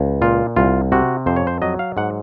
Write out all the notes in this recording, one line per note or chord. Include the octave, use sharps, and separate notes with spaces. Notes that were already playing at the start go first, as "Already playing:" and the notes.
Already playing: C#2
A#2 F4
C2 F4
C3 F#4
F2 C5
C#5
C5
F#3 D#5
F5
G#2 F#5